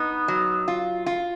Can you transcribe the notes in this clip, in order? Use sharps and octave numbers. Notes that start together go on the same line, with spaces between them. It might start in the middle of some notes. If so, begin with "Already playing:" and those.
Already playing: B3 D#4
F#3
F4
F4